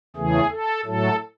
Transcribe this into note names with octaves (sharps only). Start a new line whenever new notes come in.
E2 C#3 E3 A3 G#4
A4
A2 F#3 A3 A4